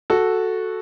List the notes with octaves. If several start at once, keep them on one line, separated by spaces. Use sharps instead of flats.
F#4 A4